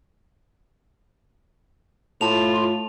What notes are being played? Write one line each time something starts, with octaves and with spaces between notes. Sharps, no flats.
A2 F4 A5 F7